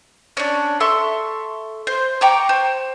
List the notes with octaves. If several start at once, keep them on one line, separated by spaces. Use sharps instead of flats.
C#4 D4
A4 E5 C6 C#6
C5
G5 A#5 C#6 D6
C5